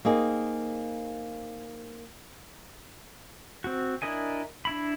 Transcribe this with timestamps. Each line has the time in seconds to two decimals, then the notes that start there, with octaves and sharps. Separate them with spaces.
0.05 A#3 C4 D#4 G#4
3.64 C4 F#4
4.02 D4 E4 A#4 D#5 G#5
4.65 D4 E4 B5